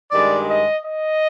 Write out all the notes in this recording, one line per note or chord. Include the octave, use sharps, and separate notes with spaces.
G2 D#3 G#3 D5
D#5
D#5